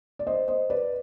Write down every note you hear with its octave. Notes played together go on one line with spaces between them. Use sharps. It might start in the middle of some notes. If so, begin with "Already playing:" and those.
D5
C5 D#5
C5 D#5
B4 D5